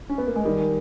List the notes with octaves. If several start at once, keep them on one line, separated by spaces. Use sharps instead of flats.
C#4
B3
A#3
G#3
D#3 G3